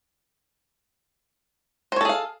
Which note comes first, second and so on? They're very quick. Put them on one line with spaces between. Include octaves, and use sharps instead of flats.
C5 C#5 A4 G#4 F5